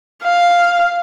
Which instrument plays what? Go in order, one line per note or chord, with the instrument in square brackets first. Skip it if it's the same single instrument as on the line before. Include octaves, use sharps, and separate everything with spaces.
[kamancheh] F5